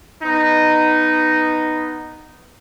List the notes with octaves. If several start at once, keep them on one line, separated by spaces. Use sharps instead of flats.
B3 D#4